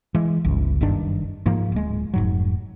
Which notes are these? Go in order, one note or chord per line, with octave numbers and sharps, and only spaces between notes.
E3 G#3
G1 C#2
F#1 G2 D#3 D4
G#2 F3 A#3
D1 G#3
F1 G#2 F#3